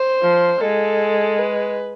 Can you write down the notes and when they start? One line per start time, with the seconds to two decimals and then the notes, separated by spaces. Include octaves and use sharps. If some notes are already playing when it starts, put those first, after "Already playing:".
Already playing: C5
0.23 F3
0.60 G#3 A4
1.38 B4